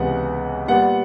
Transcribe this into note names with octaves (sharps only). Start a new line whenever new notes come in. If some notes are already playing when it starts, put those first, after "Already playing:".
Already playing: C#2 C3 E3 G#3 B3 F#5
A#2 G3 B3 F#5